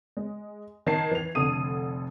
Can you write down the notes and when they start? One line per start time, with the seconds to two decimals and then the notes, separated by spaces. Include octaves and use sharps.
0.17 G#3
0.87 D#3 A5 G#6 C7
1.11 E3 F7
1.35 F1 D3 A4 D#6 D#7